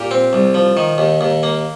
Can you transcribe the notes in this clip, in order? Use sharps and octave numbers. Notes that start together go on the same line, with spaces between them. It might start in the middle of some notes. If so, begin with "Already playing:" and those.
Already playing: A#2 G4 A#4
C4
C2
F3
D#3
D#2
D#2
A#3